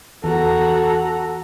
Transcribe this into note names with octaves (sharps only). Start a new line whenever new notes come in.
E2 F#4 A4 A#5